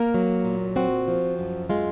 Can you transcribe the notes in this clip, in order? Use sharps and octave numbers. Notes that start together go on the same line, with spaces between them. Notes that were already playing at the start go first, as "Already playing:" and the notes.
Already playing: A#3 A#4
F#3
A#2
C4 F#4
F3
F#2
G#3 F4